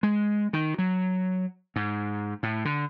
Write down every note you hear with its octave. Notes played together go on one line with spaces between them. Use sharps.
G#3
D#3
F#3
G#2
A2
D3